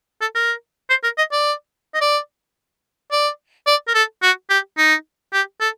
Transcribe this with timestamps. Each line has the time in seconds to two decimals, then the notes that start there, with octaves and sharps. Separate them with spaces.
0.21 A4
0.35 A#4
0.90 C5
1.03 A#4
1.18 D#5
1.32 D5
1.94 D#5
2.01 D5
3.12 D5
3.67 D5
3.88 A#4
3.94 A4
4.22 F#4
4.50 G4
4.77 D#4
5.33 G4
5.61 A4